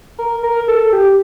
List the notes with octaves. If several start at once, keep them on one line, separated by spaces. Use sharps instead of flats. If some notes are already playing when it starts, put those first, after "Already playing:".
A#4
A#4
A4
G4